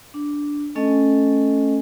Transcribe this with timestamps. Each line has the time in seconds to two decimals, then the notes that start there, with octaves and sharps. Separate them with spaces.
0.14 D4
0.75 A3 C#4 A4 D#5 G#5